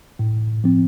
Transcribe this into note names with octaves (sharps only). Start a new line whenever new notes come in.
A2
F3 C4